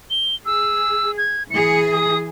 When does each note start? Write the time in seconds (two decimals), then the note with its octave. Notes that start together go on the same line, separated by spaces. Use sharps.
0.10 G7
0.46 G#4 E6
1.18 G#6
1.51 E3 G#4 C#7
1.92 D#6